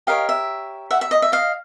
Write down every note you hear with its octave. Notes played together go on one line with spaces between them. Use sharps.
G4 A#4 C#5 D#5 F5
E5
E5 F#5
E5
D#5
E5
D#5 F5